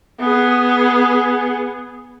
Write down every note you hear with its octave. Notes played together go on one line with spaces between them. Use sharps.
B3 G#4